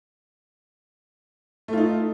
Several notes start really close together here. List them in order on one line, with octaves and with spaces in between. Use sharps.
A3 F4 D#4